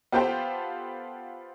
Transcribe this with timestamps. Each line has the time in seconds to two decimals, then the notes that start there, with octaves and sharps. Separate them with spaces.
0.12 B3 F4 G4 A4 C5 G5